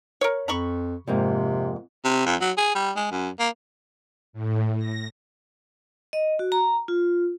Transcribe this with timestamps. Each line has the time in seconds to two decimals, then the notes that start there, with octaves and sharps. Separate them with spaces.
0.21 A#4 C#5
0.48 F2 A#5 B5 C#6
1.07 F2 G#2 C3 A#3
2.04 C3
2.26 F2
2.41 F#3
2.57 G#4
2.75 G3
2.96 G#3
3.11 F#2
3.40 A#3
4.33 A2
4.77 A#6
6.13 D#5
6.39 F#4
6.52 A#5
6.88 F4